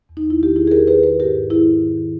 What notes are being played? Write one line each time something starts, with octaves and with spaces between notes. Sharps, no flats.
E2
D#4
E2
E4
D#3 G4
E2 E4 G#4
G#4
E2 G4 A#4
D#3 G#4 B4
D#3 G#4 B4
G#2 G4 A#4
G#2
D#3 E4 G#4
G#2
D#3
D#3